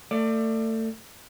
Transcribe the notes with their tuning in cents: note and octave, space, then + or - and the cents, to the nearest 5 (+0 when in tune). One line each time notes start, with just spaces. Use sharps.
A3 +30 D5 +15